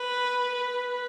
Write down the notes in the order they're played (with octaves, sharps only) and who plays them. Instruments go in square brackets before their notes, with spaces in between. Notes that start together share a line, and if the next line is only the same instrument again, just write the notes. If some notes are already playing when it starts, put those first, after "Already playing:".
Already playing: [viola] B4